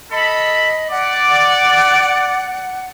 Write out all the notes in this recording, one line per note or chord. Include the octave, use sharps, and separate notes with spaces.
A4 D#5 B5
D5 F#5